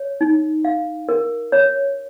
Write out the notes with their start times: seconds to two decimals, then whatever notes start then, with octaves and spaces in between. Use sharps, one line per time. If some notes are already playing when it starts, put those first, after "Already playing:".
Already playing: C#5
0.21 D#4
0.65 F5
1.09 A#4
1.52 C#5